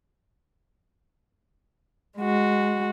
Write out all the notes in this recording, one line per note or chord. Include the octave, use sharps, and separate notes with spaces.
G#3 F#4